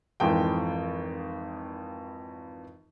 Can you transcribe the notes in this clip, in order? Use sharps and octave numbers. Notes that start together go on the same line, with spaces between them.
G#1 F2 E3 G5